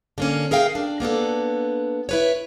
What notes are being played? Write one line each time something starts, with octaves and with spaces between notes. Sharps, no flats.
D3 A#3 C#4
G#4 A#4 E5 F5 G5
D4
A#3 B3 D4 A4
E4 B4 C#5